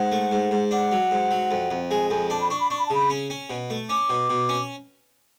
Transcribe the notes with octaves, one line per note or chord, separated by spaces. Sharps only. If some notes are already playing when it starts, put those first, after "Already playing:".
Already playing: G#2 F#5
A3
G#2
G#2
D4 F#5
F#3
G#2
F#3
F2
F2
G#3 G#5
F2 G#5
D4 A5
B5
D4 C#6
B5
D4 C#6
B5
A5
C#3 B5
C#4
C#4
B2
A3
C#4 D6
B2
B2
C#4